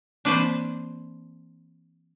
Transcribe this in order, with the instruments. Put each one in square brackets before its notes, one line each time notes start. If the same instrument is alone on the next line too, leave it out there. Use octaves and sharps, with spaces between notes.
[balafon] E3 A#3 C4 [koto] D4 B4 C5